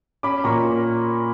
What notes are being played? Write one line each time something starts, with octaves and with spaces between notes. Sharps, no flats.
C#4 B5 D6
A#2 A#5 C#6
A#3